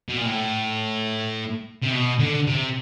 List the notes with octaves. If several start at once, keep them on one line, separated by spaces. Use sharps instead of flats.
B2
A#2
A2
C3
B2
D3
C3